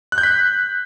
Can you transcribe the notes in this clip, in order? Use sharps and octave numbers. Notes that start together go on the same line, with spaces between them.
F#6
G6
B6